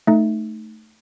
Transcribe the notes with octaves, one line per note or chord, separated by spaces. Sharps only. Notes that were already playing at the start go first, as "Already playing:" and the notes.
A3 D#4